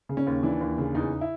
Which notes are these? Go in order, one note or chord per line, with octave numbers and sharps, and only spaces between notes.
C#3
C#4
D#2
E3 D4
D#2
C#3
E2 D#4
E4